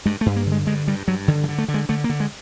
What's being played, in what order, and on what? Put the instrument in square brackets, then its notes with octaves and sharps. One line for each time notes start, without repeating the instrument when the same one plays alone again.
[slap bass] G2 G#3
A3
G2
A#3
D3
G#3
G2 G#3
G2 G3
G2 F#3
D3 D#3
E3
D3
A3
D3
G#3
D3 A3
A#3
D3
G#3